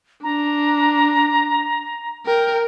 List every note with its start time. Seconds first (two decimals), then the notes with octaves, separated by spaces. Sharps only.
0.23 D4 A#5
2.26 A#4 G5